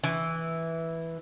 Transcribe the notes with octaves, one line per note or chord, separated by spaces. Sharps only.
E3